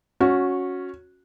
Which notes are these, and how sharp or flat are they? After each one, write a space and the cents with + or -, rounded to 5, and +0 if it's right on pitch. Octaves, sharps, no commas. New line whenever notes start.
C#4 +0 F#4 -15